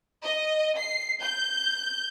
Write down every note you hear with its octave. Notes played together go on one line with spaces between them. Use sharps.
D#5
C7
G6